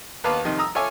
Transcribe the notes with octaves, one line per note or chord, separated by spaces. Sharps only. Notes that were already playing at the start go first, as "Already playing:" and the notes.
D#2 B3 B4 F5 A5 D6
C3 D#3 F3
A#5 D#6 E6
F4 A4 C#5 E5 G#5 D6